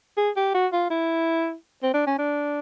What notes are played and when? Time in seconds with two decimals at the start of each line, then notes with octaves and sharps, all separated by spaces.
0.17 G#4
0.37 G4
0.54 F#4
0.73 F4
0.90 E4
1.83 C4
1.94 D4
2.07 C#4
2.19 D4